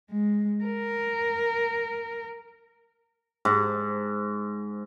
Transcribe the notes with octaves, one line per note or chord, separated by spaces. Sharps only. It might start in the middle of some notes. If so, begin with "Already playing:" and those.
G#3
A#4
G#2